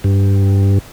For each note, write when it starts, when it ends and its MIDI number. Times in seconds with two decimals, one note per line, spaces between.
0.04 0.79 43